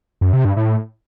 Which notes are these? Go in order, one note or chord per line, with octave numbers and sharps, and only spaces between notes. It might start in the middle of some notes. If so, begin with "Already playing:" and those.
F#2
C3
G2
A2